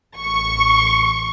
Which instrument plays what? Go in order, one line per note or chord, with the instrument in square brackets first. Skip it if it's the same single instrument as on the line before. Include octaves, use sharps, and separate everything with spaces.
[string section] A1 C#6